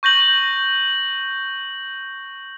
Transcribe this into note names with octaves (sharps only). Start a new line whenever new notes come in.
C#6 G6 A#6 F#7